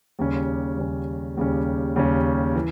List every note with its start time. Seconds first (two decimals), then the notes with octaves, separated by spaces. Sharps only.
0.19 D#2 C#3 G3 C#4
0.78 D#2 C#3 G3 C#4
1.37 D#2 C#3 G3 C#4
1.96 D#2 C#3 G3 C#4
2.55 E3